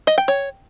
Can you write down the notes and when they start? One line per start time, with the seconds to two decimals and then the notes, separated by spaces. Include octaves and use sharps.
0.07 D#5
0.18 G5
0.28 C#5